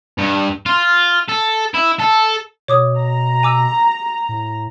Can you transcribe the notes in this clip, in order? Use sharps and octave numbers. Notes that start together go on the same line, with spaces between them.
G2
F4
A4
E4
A4
B2 C#5 D6 D#6
A#5
G#5 D6 E6
A2